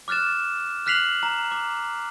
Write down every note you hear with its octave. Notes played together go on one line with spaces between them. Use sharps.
D6 F6 F#6 A6 E7
F6 F#6 B6 C7 F7 F#7
A#5
D6